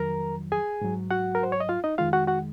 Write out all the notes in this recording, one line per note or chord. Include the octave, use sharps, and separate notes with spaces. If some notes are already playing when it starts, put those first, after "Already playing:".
Already playing: F2 D#3 F#3 A#4 A#5
G#4 G#5
G#2 F#3
F#4 F#5
A#4
C5
C#5
D#5
F4 F5
D#4 D#5
F2 D#3 G#3 F4 F5
F#4 F#5
F#4 F#5